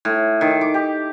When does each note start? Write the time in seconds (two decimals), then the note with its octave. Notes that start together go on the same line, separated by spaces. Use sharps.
0.05 A2
0.41 D#3
0.61 D6
0.74 G4